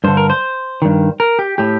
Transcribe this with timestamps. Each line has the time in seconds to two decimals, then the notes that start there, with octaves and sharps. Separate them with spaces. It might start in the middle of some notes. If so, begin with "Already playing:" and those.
0.04 G2 D3 C5
0.17 A#4
0.30 C5
0.82 G2 D#3
1.20 A#4
1.39 G4
1.58 A2 G4